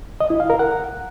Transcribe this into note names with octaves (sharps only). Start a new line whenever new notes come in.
D#5
E4
F5
A#4
F#5